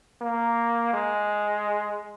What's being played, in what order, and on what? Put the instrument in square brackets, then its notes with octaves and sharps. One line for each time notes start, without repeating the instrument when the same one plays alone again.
[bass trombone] A#3
G#3